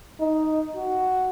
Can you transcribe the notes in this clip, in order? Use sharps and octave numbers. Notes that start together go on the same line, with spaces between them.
D#4
F#4